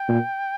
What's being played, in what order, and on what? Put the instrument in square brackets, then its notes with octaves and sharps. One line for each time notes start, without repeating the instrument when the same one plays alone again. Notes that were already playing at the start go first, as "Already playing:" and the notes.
Already playing: [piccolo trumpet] G5
[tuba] A#2